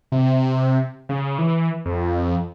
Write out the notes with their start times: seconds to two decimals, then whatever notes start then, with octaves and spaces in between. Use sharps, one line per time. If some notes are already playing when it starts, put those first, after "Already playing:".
0.12 C3
1.09 C#3
1.38 E3
1.85 F2